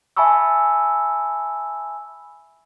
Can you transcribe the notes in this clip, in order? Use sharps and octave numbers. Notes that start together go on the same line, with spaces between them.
E5 G#5 A5 B5 C#6 E6